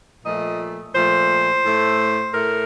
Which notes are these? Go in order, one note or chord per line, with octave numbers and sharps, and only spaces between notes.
A#2 F3 A3 D#5
A#2 F3 A3 C5
A2 A3
A2 A3 A#4